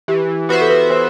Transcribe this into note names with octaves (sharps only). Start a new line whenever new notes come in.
E3 G4
B3 F#4 B4 C5 E5
A4
B4
B4
E3 C5